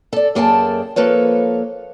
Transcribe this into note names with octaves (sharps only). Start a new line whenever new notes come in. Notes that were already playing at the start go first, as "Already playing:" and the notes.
A4 D5
F#2 A#3 G#4 A4 G5 A5
F3 A#3 A4 B4 C#5